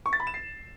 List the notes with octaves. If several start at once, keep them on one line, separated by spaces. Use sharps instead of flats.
C#6
A6
B5
E7
C7